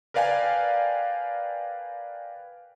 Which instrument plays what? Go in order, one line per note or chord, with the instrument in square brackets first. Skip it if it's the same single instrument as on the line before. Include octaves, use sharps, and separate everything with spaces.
[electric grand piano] A#4 B4 D5 F5 G5 G#5